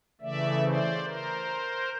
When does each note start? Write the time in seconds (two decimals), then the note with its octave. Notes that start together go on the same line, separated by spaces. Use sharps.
0.21 C#3 E3 A3 D5 E5
0.62 C5 D5
1.03 A#4 C5